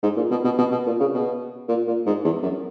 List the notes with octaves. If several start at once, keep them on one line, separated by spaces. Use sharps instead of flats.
G#2
A#2
B2
B2
B2
B2
A#2
C#3
B2
A#2
A#2
G#2
E2
F#2